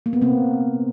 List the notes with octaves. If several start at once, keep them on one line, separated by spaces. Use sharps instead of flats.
A#3
B3
C3 A#3 C4